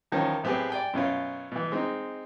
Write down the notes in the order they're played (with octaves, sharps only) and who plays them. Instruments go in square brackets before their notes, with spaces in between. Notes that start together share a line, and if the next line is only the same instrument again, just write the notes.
[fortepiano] E2 D#3 F3 C#4
A2 B3 C4 G4 G#4
D5 G5 G#5
F#2 B2 C#4 F4
B2 E3
G#3 C4 D#4